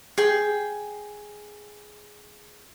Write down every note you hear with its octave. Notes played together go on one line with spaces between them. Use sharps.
G#4 G5